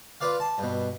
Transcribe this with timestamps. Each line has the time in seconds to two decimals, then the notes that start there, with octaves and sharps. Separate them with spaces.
0.20 F4 B4 D5 F5
0.40 A5
0.58 G2 B2